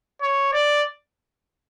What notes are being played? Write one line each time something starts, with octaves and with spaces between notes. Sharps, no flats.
C#5
D5